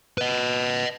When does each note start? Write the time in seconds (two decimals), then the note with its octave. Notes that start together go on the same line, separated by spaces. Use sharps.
0.18 B4 D#5